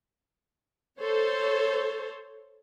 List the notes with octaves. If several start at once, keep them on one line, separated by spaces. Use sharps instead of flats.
A4 C5 C#5